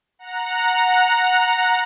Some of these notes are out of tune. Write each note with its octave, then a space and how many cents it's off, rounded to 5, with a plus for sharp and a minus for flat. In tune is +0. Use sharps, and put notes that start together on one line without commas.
F#5 -10 A#5 +0